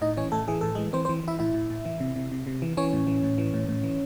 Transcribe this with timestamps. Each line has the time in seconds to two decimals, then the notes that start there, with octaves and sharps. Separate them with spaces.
0.01 A2 D#4 D#5
0.17 E3 C#4 C#5
0.32 A2 A3 A4
0.48 E3 G#4
0.61 A2 A4
0.75 E3 G#3 G#4
0.93 E3 C4 C5
1.05 C4 C5
1.09 E3
1.24 E3 E4 E5
1.39 A2 E4 E5
1.54 A2
1.70 A2
1.85 E3
2.00 C3
2.16 C3
2.32 C3
2.47 C3
2.62 E3
2.77 E3 C#4 C#5
2.93 A2
3.07 E3
3.23 A2
3.38 E3
3.54 A2
3.69 A2
3.84 E3